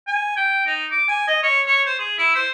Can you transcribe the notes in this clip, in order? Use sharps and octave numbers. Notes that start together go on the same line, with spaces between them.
G#5
G5
D#4
D6
G#5
D#5
C#5
C#5
C5
G#4
E4
C5